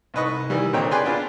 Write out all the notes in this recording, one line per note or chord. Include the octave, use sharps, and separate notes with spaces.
C2 G#2 B4 D#5 C#6
D#3 E3 G3
A#2 D3 C4 D#4 C#5 G5
G#4 B4 D5 G5 G#5 C6
B3 D4 F4